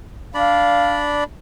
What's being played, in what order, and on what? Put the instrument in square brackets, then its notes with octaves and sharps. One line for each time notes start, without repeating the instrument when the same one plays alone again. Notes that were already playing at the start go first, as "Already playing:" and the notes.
[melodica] D4 D5 B5 [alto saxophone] F5